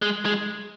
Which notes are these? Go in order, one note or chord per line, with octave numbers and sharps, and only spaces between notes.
G#3
G#3